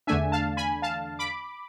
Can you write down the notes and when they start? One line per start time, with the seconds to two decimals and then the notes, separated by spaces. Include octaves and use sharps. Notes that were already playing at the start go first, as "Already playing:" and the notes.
0.07 E2 D3 A3 D4 E5 G#5
0.32 F5 A5
0.57 G#5 B5
0.82 F5 A5
1.19 B5 D6